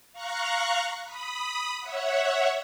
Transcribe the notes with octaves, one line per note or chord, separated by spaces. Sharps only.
F5 A#5 C#6 F#6
B5 D#6
C#5 E5 F#5